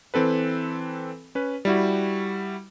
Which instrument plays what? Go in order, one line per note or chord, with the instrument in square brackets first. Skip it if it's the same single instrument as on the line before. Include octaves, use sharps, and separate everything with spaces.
[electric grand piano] E3 C4 A4 B4
C#4 B4
G3 E4 F#4